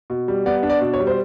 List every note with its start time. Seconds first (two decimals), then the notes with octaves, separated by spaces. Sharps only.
0.10 B2
0.28 G3
0.46 B3 D5
0.63 D4
0.70 D5
0.81 B2
0.94 C#5
1.00 G3
1.07 C5